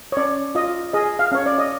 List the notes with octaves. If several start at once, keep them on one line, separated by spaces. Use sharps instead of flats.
C#5
C#4 D5
F4 D#5
G#4 D#5
F5
C#4 C#5
D5
D#5